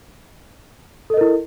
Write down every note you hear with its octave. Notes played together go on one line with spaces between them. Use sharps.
E4 A4 A#4 D#5